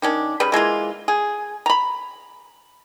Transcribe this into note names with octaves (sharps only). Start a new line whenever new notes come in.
D#3 C#4 D4
C#3 G3 B4
E3 G#3 A#3 F4
G#4
A#5 B5